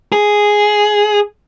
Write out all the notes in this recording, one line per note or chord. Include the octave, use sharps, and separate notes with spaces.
G#4